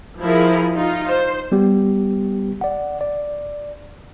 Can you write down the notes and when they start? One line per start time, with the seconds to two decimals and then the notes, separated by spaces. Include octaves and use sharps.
0.21 F3 E4 G#4 A#4
0.75 D#4 F4
1.07 C5
1.52 G3 B3 G4
2.61 D5 F#5
3.01 D5